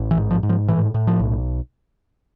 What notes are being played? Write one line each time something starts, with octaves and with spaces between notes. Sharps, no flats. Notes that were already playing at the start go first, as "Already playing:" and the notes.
Already playing: A1
E3
G#2
F3
G#2
F3
A2 E3
A2
F3
B1